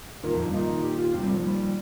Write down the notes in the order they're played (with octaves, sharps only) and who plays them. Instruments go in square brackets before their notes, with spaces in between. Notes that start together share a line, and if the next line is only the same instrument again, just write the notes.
[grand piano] A#2 D#3 [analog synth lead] A#3
[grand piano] F2 A#2
G2
[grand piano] A#2 D#3 [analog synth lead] D#4
[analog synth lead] G4
F4
[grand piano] G2 C3 [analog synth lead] C4
[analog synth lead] G3
[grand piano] A#2 D#3
[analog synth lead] F3
G3